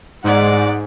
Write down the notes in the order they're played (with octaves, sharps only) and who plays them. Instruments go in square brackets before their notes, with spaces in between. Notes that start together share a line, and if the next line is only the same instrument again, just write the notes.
[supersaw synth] G#2 [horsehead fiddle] D5 F#5